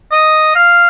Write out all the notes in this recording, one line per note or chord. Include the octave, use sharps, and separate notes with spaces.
D#5
F5